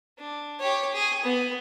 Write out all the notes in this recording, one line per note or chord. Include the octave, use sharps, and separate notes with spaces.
D4
G4 C#5
G#4
B3